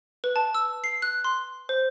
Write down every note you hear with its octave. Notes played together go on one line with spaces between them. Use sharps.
B4
A5
E6
C7
F#6
C6
C5